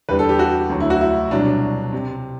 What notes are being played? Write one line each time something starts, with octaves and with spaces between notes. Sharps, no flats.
E2 D3 G3 B4
A4
G4
F#4
D2 D3 F#3
E4
F#4
E4
C2 B2 F#3 D4
C3